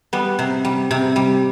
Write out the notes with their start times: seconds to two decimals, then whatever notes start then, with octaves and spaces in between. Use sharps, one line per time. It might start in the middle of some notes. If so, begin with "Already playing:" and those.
0.13 G3 B3
0.39 C3
0.65 G3
0.91 C3
1.16 G3